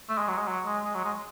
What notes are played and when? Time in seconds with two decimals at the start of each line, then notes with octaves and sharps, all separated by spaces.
0.09 A3
0.18 G#3
0.28 F#3
0.37 G#3
0.47 F#3
0.66 G#3
0.85 G#3
0.94 F#3
1.04 G#3